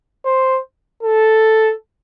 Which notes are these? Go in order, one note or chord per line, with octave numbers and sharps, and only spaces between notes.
C5
A4